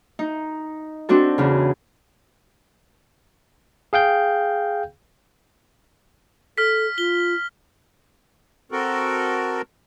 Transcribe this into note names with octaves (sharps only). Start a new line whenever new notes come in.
D#4
C4 D4 F#4 A4
E2 C#3
G#4 F5 G5 G6
A4 F6 B6
F4 G7
C4 F#4 A4 A#4